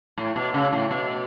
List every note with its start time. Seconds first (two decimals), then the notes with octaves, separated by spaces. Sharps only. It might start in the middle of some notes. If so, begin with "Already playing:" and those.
0.18 A2
0.36 B2
0.54 C#3
0.73 A2
0.91 B2